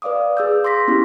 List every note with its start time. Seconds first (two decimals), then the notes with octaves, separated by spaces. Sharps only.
0.02 B4 D5 F5 D6 D#6
0.37 G#4 E6 G6
0.64 C6 D6 A#6 B6
0.88 B3 C#4 E4 G4